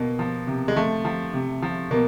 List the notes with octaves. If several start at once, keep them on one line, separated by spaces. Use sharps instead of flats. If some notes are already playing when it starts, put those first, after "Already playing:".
Already playing: B2 A#3
F3
C3
G#3
F3 A3
F3
C3
F3
B2 A#3